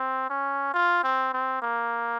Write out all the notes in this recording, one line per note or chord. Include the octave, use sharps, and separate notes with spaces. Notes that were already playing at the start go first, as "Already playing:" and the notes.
Already playing: C4
C#4
F4
C4
C4
A#3